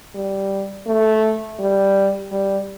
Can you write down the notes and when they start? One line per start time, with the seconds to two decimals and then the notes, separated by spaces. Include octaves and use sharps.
0.15 G3
0.87 A3
1.59 G3
2.32 G3